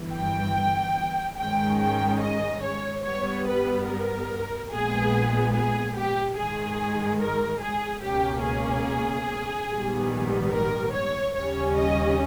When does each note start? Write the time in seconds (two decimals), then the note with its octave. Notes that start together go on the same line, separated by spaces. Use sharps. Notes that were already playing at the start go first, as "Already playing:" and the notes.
Already playing: G1 G2 E3
0.14 G5
1.37 G#2 D#3 G#3 C#4 G5
1.79 G5
2.21 D#5
2.62 C#5
3.03 G2 G3 B3 C#5
3.46 B4
3.86 A#4
4.70 A#1 A#2 G#3 B3 G#4
5.53 G#4
5.95 G4
6.36 G#2 D#3 G#3 G#4
7.20 A#4
7.61 G#4
8.02 C#2 B2 A#3 C#4 G4
8.43 G#4
9.69 A#1 G#2 D#3 G3 B3
10.52 A#4
10.93 C#5
11.34 D#2 C#3 G3 C#4 C#5
11.77 D#5